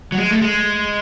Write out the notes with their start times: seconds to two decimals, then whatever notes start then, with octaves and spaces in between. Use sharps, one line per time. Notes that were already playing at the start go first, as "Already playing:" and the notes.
0.12 F#3
0.17 G#3
0.31 A3
0.42 G#3